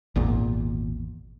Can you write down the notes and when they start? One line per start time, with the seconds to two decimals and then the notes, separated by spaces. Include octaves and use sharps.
0.16 G#1 E2 A#2